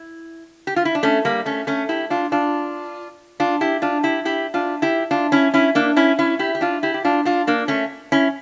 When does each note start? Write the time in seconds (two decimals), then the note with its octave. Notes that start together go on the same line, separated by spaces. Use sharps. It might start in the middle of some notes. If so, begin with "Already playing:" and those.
Already playing: E4
0.67 G4
0.76 F4
0.85 E4
0.95 D4
1.03 A3 C#4
1.25 G3 A#3
1.46 A3 C#4
1.67 A3 C#4
1.89 E4 G4
2.10 D4 F4
2.32 D4 F4
3.40 D4 F4
3.61 E4 G4
3.82 D4 F4
4.03 E4 G4
4.25 E4 G4
4.54 D4 F4
4.82 E4 G4
5.11 D4 F4
5.32 C#4 E4
5.54 C#4 E4
5.75 A#3 D4
5.97 C#4 E4
6.19 C#4 E4
6.39 E4 G4
6.55 G4
6.61 D4 F4
6.83 E4 G4
6.94 G4
7.05 D4 F4
7.25 D4 F4
7.47 A#3 D4
7.68 A3 C#4
8.12 C#4 E4